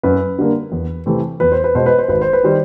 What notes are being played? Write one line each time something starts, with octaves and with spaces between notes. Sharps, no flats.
F#2 B4
D3 G3 A#3
E2
C3 E3 A3 C4
E2 B4
C5
B4
B2 G#3 C5
B4
C5
G#1 B4
C5
B4
D#3 G3 C5